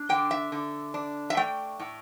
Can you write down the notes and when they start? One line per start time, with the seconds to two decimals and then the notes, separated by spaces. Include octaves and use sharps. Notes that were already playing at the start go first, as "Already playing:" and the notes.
Already playing: D4
0.09 D3 G5
0.31 E5
0.52 D3
0.94 D4
1.30 E5
1.37 A3 G5
1.79 A2